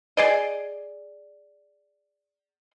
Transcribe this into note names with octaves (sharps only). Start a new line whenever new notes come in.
G#4 D5 D#5